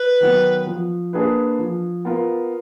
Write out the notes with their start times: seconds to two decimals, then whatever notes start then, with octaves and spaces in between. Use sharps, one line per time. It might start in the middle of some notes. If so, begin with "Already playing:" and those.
Already playing: B4
0.21 D#3 F#3 B3
0.67 F3
1.13 A#3 D4 G#4 B4
1.59 F3
2.05 B3 F4 A#4